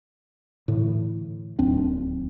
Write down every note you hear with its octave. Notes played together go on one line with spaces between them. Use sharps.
A2 D3 E3
D1 D#2 C4 D4